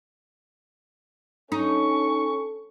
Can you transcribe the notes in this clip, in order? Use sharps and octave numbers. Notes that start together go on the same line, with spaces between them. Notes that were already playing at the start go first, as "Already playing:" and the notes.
C#4 D#4 A4 C#6